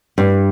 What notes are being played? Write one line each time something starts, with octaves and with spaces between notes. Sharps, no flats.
G2